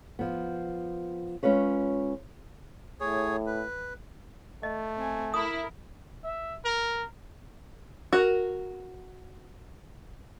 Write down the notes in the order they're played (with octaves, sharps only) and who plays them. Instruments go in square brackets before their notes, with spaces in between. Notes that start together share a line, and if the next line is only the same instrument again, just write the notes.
[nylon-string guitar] F3 B3
G#3 C#4 F4 B4 C#5
[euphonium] A2 [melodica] G#4 C#5
[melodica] B4
[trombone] A3 [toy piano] D#5
[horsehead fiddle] C4 G#5
[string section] E4 [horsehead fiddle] A#4 [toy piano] D#6
[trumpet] E5
A#4
[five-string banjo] F#4 A#4